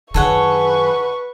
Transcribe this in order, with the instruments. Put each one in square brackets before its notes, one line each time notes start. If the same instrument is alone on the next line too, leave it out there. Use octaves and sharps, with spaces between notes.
[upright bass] F#2 D#3 [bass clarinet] G#4 [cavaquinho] A4 C#5 F#5 [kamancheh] B4 C#6